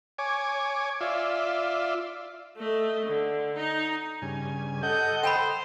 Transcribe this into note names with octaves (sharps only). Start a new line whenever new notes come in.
C#5 G#5 D6
F4 D5 E5
A3 D#5
D3
D#4 D#5
G2 C#3 G#5
A4 D#5 F#5 G6
C5 G5 A5 B5